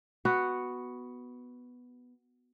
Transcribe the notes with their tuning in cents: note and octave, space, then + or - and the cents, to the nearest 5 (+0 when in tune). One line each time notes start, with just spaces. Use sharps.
B3 +0 F#4 +0